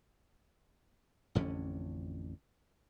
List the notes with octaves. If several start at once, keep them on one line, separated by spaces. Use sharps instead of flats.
A1 F2 D3 C#4